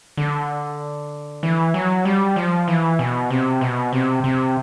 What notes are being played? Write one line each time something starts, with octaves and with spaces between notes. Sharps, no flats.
D3
E3
F#3
G3
F3
E3
B2
C3
B2
C3
C3